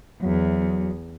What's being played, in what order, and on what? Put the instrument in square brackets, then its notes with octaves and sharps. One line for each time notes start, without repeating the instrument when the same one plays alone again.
[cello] E2 [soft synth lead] F#3